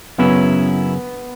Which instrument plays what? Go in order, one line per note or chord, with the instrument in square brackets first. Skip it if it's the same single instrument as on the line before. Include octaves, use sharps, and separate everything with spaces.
[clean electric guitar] F#2 C#3 F#3 C#4 E4 [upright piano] B3